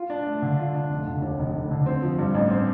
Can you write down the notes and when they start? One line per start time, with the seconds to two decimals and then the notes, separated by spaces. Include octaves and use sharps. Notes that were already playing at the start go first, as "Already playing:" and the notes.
Already playing: F4
0.10 D4
0.27 A3
0.42 D3
0.59 F4
0.74 D4
0.90 F1
1.07 D3
1.22 D#2
1.38 F1
1.55 F1
1.71 D3
1.86 C4
2.02 F3
2.19 G2
2.34 A1
2.50 C4